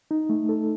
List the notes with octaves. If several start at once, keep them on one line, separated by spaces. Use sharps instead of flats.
D#4
A3
A4